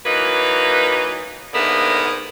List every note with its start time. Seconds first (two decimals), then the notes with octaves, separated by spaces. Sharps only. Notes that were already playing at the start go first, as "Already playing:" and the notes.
0.06 E3 F#3 A#3 D#4 B4
1.53 G#2 D3 A#3 B3 A#4 E5